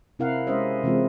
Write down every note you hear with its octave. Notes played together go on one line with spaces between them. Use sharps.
C3 C4 E4 A#4 F5 F#5
G#3 C#4 G4 C5 D#5 E5
C3 E3 G#3 C4 F4